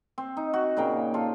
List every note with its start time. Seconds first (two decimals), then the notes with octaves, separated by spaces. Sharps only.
0.18 C4
0.37 D#4
0.53 F#4
0.77 A#2 C#3 A#4 G5
1.14 F4 A4